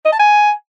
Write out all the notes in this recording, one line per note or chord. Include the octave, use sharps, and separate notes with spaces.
D#5
A5
G#5